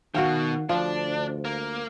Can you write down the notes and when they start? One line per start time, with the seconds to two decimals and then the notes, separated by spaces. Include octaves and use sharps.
0.14 B2 D#3 F#4 F5 G5
0.69 D2 F3 D4
1.45 A#3